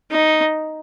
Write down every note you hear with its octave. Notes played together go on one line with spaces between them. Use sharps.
D#4